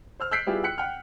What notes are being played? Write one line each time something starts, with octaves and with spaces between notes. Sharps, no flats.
C5 E6 F6
E6 F#6 G6 B6 C7 D7
G3 B3 E4 F4 G4 G#4
G5 F#6 B6 C#7
F#5 G5 F6